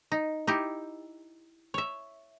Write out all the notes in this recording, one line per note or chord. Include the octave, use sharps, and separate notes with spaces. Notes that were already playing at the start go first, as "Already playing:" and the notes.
D#4
D#4 E4 G4
C#5 E5